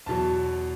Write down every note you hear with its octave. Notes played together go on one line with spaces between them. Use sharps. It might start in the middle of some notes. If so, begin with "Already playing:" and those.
E2 B2 F#3 A5